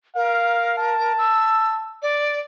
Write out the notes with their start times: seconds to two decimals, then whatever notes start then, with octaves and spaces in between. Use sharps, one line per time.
0.16 A#4 F5
0.78 A5
1.18 E6
2.02 D5